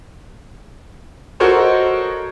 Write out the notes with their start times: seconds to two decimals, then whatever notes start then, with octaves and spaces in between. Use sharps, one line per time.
1.40 F#4 A4 A#4 C5 C#5 D#5